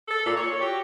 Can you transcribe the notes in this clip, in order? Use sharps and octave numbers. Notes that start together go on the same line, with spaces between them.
A4
A#2
C#5
F#4 G4